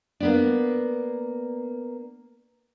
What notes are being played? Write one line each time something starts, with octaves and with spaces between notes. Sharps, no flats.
A#3 B3 D4